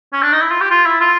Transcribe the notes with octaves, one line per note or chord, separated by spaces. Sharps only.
C#4
D4
D#4
E4
F4
G4
F4
E4
F4